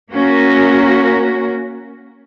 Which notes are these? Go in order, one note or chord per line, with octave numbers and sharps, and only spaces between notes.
A#3 C#4 F#4 A#4